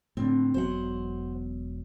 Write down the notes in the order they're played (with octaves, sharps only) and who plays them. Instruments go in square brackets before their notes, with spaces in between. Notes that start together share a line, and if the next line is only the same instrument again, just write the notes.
[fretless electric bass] A2 D3 [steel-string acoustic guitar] C4
[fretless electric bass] E1 B2 F#3 [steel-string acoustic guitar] C5 F#5